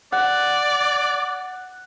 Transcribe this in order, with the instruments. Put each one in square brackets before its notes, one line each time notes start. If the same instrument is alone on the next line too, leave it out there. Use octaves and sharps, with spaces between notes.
[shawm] D5 [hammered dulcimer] F#5